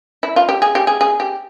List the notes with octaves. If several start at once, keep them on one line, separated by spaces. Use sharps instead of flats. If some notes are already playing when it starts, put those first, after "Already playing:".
E4
F4
G4
G#4
G4
G#4
G#4
G4